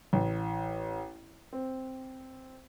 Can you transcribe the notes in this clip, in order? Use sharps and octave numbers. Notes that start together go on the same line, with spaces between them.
A1
C4